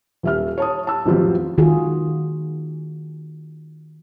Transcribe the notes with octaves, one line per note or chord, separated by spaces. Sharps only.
D#1 E5 F6
C#5 A5 D#6
A5 E6
A1 F2 D#3 F#3 F4 G4
D#3 F4 F#4 G#4